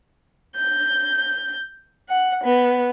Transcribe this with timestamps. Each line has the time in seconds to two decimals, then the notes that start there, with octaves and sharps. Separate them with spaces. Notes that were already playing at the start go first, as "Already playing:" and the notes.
0.56 G6
2.09 F#5
2.44 B3